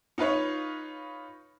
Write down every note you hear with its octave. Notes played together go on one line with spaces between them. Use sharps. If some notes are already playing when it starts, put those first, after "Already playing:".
D#4 F4 B4 C#5